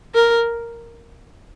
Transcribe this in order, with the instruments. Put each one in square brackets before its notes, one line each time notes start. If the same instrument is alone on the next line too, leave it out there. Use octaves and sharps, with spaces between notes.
[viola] A#4